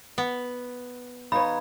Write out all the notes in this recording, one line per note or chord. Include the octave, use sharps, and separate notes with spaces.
B3
E2 D#4 B4 C#5 F5 B5